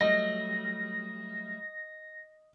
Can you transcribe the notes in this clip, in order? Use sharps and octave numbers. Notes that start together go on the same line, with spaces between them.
F#3 G3 A3 D#5 A#6